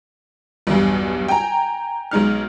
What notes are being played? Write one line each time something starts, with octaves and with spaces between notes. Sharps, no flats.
B1 E2 G2
G5 G#5 A#5
B1 G#3 D#4 F6